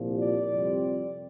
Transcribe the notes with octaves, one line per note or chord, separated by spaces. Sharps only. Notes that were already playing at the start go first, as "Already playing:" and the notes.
Already playing: C2 A#2 F3
D5
F2 C3 G3 C4